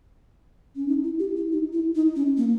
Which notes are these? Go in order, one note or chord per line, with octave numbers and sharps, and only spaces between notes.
C#4
D#4
E4
G4
E4
D#4
E4
D#4
C#4
A#3